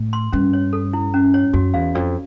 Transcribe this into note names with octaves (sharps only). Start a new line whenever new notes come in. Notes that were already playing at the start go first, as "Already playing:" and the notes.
Already playing: A2
C6
G2 C#4
C#5
A4
E4
C#4
C#5
F#2 F#4
E2 F5
F2 D5